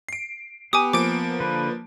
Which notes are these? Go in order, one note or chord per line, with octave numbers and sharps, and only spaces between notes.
C7 D7
B3 G4 G#5 D6 D#6
F3 A#3 D6 D7
D3 B4